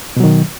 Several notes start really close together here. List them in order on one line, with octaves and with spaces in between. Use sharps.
B2 F#3 D#3